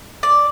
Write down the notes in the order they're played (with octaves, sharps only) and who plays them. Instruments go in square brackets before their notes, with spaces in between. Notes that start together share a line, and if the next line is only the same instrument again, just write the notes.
[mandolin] D5